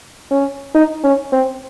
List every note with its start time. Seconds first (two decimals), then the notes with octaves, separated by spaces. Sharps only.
0.31 C#4
0.75 D#4
1.04 C#4
1.32 C4